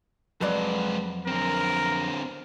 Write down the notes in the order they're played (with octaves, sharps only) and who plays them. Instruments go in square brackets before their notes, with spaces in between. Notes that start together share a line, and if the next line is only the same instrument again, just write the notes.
[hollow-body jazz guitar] F2 F#3 D5 [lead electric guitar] G#3 B4
[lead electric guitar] D3 C4 [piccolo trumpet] A#4